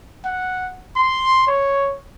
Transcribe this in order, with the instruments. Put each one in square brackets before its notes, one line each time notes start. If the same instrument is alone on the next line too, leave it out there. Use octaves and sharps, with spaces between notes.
[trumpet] F#5
C6
C#5